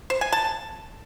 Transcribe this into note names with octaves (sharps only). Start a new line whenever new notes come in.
C5
G#5
A5